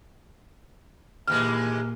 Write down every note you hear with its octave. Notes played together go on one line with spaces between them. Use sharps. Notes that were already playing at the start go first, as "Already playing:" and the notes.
D#2 A#2 E3 G#3 A#3 F6